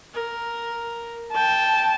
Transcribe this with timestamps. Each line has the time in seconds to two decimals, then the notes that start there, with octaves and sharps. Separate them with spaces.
0.14 A#4
1.34 G5 A5